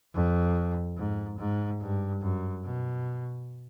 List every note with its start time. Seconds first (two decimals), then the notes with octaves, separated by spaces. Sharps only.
0.14 F2
0.97 G#2
1.38 G#2
1.80 G2
2.22 F#2
2.64 B2